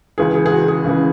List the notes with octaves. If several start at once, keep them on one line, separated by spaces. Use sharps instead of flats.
C#2 C#3 E3 G#4
G#4
G#4
F#4
G#4
C#2 C#3 E3